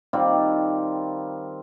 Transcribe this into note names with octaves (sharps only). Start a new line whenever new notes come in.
D#3 G3 C4 F4